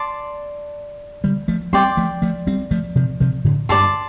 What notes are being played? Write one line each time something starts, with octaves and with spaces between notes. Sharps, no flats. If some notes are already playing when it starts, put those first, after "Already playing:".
Already playing: D5 A5 C6
D3 G3
F3 A3
G3 C4 D5 G5 C6
F3 A3
F3 A3
G3 C4
F3 A3
C3 F3
C3 F3
A2 D3
G2 D5 A5 C6